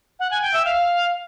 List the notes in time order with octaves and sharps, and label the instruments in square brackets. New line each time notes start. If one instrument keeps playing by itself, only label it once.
[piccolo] F#5
G#5
G5
E5
F5